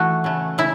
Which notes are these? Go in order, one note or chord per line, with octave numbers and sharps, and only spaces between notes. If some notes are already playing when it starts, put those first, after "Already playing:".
Already playing: E3 A3 F#4
C#3 A3
C#3 E4